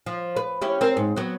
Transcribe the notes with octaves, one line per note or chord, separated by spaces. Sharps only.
F3
B4
C#4 E4 G4
C4 A#4 C5
G#2
F#3 B3